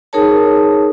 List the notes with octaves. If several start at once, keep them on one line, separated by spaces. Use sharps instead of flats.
D#4 G#4 A#4 C#5 A5